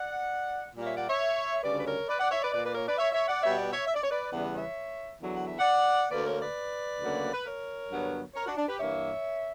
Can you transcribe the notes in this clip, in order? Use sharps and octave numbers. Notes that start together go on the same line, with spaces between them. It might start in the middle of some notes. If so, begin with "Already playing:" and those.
Already playing: D5 F#5
A#2 G3 A#3
C#5 E5
D5 F#5
C#5 E5
D2 C#3 G3 B4 D5
B4
A#4 C#5
B4 D5
D5 F#5
C#5 E5
B4 D5
A#2 A#3 B4 D5
B4 D5
A#4 C#5
B4 D5
C#5 E5
C#5 E5
D5 F#5
B2 G3 B3 C#5 E5
D5 F#5
C#5 E5
E5
D5
C#5
B4 D5
E2 C#3 E3 G3 B3 D5 F#5
C#5 E5
E2 D3 F#3
F#5
E5
D5 F#5
D2 D3 A#3 B4 D5
A#4 C#5
B4 D5
D2 C#3 F#3 A#3
B4
A#4 C#5
G2 D3 F#3 B3
A#4 C#5
D4 F#4
D4
G4 B4
G2 E3 A#3 C#5 E5